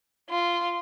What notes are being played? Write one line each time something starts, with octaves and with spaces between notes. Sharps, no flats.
F4